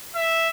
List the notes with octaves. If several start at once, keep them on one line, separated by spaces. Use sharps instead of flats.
E5